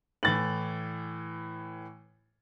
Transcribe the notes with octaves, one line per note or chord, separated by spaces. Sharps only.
A2 E3 A6 F#7